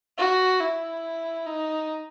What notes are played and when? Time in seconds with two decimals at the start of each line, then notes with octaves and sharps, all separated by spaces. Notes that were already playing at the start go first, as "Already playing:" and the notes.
0.18 F#4
0.61 E4
1.46 D#4